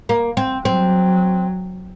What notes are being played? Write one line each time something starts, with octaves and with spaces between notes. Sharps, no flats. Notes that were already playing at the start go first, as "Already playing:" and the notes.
A#3
C4
F#3 C4